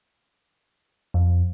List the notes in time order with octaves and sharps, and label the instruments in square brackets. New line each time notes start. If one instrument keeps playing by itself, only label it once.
[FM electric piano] F2